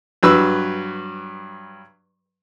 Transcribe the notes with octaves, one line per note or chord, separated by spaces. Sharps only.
G2 F#3 B4 E6